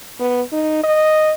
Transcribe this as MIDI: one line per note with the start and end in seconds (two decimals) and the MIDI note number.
0.20 0.42 59
0.52 0.81 63
0.83 1.34 75